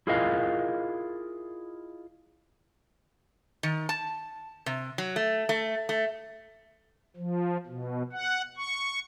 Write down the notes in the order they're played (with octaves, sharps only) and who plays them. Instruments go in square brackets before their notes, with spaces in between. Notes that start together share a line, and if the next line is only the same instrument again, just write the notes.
[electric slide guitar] E4 F4 G#4 A#4 D#5 F5
[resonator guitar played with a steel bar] D#3
A5
C3
F#3
A3
A3
A3
[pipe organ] F3
B2
F#5
C#6